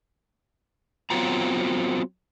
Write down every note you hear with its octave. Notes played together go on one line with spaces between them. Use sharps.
F#3 B3 C4 F4 A#5